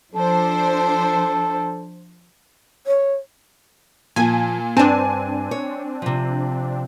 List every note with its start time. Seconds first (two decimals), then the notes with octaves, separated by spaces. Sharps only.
0.15 F3 D4 A4 C5
2.87 C#5
4.16 A#2 F3 G#5
4.77 G2 C4 D4 G#5 A5
5.51 C#5
6.02 C3 F3